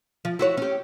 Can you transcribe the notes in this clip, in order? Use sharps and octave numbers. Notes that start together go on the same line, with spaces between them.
F3
E4 F#4 C#5
C#4 G4